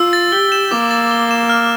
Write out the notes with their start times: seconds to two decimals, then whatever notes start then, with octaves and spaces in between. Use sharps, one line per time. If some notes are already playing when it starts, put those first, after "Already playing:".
Already playing: F4 E6
0.13 A6
0.32 G4 G7
0.52 E7
0.71 A#3 D6
0.91 A6
1.11 G7
1.31 E7
1.49 F6